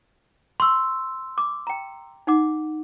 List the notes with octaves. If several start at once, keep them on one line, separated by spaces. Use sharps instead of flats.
C6 C#6 E6
D6
G5 A#5
D#4 F#5 D6